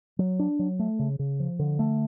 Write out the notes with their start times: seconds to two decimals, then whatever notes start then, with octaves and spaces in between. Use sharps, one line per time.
0.19 F#3
0.39 D4
0.59 F#3
0.79 A3
0.99 C#3
1.19 C#3
1.40 F3
1.59 D3
1.79 A3